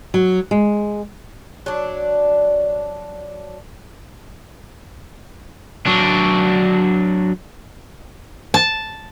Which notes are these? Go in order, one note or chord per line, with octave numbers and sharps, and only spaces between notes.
F#3
G#3
F#3 D4
F#3 D4
A5